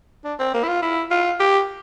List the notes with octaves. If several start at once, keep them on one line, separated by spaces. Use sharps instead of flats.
D4
C4
A#3
E4
F4
E4
F4
G4